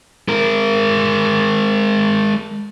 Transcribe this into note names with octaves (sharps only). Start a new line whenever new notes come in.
G#3 A#4